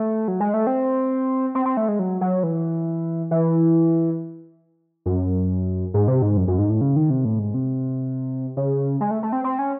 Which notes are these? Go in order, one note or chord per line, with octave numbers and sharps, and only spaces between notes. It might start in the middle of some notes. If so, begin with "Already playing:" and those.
Already playing: A3
F#3
G#3
A3
C4
C4
C4
A3
G#3
F#3
F#3
E3
E3
F#2
G#2
C3
G#2
F#2
F#2
G#2
A2
C#3
D#3
C3
A2
G#2
C3
C#3
G#3
A3
A3
C4
C4
C#4